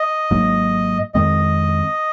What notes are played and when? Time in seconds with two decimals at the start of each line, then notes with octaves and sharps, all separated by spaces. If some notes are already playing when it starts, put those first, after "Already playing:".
Already playing: D#5
0.31 G#1 G#2 F#3 A#3
1.14 F2 D#3 G#3 C4 D#5